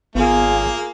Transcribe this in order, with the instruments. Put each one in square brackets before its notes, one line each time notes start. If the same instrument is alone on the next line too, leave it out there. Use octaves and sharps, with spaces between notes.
[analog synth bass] G#1 [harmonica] A#3 [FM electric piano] B3 [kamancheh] F4 G#4